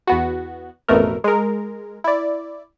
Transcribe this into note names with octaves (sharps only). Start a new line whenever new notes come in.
E2 B3 F#4
A1 F2 B2 A3 A#4
G#3 A#4
E4 D5